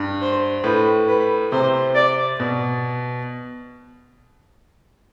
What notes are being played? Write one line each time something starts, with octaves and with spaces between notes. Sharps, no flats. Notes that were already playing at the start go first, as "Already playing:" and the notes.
Already playing: G2
C5
A2 B4
B4
C3 C5
D5
B2